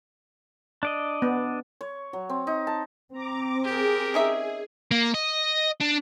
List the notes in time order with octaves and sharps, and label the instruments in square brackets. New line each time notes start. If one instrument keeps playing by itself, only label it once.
[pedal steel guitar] D4 D5 D#5
[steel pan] B3
[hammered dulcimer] C#5
F#3
C4
D#4
A5
[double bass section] C4 [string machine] A#5 D6
[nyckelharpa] G4 A#4 [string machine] G#4
[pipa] C#4 D#4 E5
[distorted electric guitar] A#3
D#5
D4